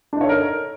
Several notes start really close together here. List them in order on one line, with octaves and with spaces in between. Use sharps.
D4 D#4 C#5 A4 A#4